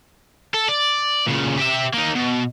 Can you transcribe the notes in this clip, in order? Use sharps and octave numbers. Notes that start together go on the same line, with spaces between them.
A4
D5
A#2 C#3
G4 E5
A#3 D#4
B2